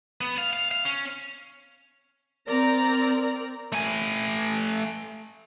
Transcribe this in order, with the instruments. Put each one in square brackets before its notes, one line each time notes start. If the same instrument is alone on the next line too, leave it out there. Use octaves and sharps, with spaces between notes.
[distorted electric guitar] B3
F5
F5
F5
C#4
[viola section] C4 A#4 D5 A#5
[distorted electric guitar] A3 G#5